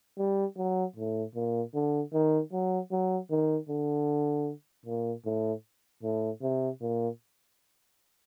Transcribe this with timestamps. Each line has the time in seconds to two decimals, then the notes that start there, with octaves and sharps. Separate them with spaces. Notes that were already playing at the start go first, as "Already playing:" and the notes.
0.18 G3
0.57 F#3
0.96 A2
1.35 A#2
1.74 D3
2.13 D#3
2.52 F#3
2.91 F#3
3.30 D#3
3.69 D3
4.86 A#2
5.25 A2
6.03 A2
6.42 C3
6.81 A#2